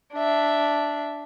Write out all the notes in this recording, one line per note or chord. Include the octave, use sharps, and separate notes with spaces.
D4 E5